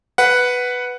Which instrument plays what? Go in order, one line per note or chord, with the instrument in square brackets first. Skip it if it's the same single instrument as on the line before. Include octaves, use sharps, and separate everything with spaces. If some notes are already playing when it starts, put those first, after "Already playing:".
[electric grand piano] B4 F#5